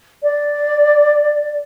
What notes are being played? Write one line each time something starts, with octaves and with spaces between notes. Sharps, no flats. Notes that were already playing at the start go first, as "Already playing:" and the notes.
D5